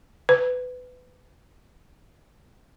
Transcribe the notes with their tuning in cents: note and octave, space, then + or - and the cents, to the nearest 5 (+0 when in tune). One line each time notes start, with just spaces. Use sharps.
B4 +25